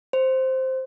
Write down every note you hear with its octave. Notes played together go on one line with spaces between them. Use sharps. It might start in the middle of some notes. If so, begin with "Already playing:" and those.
C5